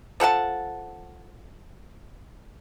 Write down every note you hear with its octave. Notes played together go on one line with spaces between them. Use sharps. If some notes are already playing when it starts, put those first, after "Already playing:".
F3 A4 F#5 A5